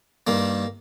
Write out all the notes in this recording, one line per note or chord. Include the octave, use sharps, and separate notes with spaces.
G2 D#3 A#3